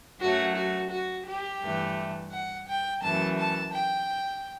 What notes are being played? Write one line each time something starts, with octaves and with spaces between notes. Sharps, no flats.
F#2 F#3 A3 F#4
F#4
F#4
G4
G2 E3 A3
F#5
G5
F#2 E3 A3 A5
A5
G5